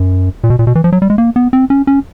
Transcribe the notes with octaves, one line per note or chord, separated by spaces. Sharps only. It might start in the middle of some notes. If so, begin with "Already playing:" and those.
Already playing: F#2
A#2
B2
A#2
B2
E3
F3
F#3
G3
G#3
A#3
B3
C4
C#4
C#4